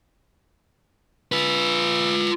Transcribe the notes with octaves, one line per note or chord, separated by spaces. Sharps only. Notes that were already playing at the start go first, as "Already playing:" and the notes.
F4 B4